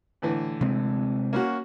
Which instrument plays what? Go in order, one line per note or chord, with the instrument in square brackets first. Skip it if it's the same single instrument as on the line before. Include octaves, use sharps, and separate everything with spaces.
[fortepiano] A2 D3 E3
[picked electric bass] C3 G#3 C4
[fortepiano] A#3 C#4 F#4